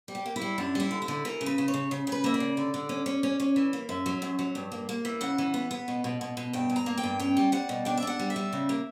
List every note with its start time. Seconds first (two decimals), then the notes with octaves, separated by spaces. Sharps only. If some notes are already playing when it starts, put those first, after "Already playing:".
0.08 G3
0.15 G4
0.26 A#3
0.36 E4
0.41 G3
0.58 F#2 D4
0.75 G3 E4
0.91 D3
1.02 E4
1.08 D3
1.25 E3 A#4
1.41 C#3
1.46 B4
1.58 C#3
1.68 C#5
1.74 C#3
1.91 C#3
2.07 C#3
2.12 B4
2.24 A#3 E5
2.34 D5
2.40 C#3
2.57 D3
2.74 D3
2.89 C#4
3.06 C#4
3.23 C#4
3.40 C#4
3.56 E3
3.73 A#3
3.89 F#2 E5
4.06 F#3
4.22 F#2
4.39 F#3
4.55 G2
4.72 A#3
4.89 A#3
5.05 E3
5.21 C#3 F#5
5.38 E3
5.54 B3
5.71 B3
5.88 B2
6.04 B2
6.21 B2
6.37 B2
6.53 G2 G5
6.70 G2
6.76 A#5
6.86 A#3
6.98 G5
7.03 G2
7.19 C#4 G5
7.37 G3
7.52 G3 F#5
7.69 B2
7.85 D4 G5
7.97 E5
8.03 D4 F#5
8.19 G3
8.30 E5
8.36 G3
8.53 C#3
8.69 A#3